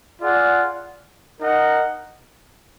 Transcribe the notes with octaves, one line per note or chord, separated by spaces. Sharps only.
F4 G#4 D5 F#5
D#4 A#4 D#5 F#5